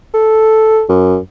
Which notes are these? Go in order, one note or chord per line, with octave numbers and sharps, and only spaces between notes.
A4
F#2